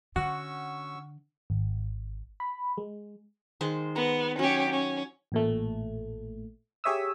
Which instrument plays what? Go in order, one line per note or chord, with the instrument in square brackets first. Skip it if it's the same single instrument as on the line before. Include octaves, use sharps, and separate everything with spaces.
[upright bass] D3 [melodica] C#4 C#6 E6 [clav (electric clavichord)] F#4 [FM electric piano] F#5
[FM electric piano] G#1
B5
G#3
[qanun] D#3 G#3 C5
[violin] B3 [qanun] A#5
[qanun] F#3 C#5 [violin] C#4 G4
[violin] C#4
[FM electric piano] A1 A#2 A3
G4 G#4 C#5 E5 D#6 E6